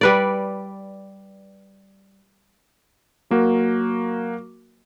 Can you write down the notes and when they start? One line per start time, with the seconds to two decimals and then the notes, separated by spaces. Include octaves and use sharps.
0.01 G3 B4 D5
3.30 F#3 A#3 F#4 A#4